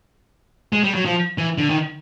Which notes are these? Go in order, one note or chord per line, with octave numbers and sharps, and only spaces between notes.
G#3
G3
F#3
F3
E3
D3
D#3